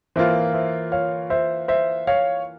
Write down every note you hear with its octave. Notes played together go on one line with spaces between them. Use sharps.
E3 A#3 F4 C5 E5
C5 E5
C#5 F5
C5 E5
C5 E5
C#5 F5